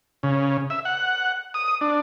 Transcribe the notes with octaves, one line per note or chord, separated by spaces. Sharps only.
C#3
E5
F#5
D#6
D4